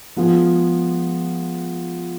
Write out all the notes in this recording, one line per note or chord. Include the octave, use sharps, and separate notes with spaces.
F3 G#3 B3 F4 G#4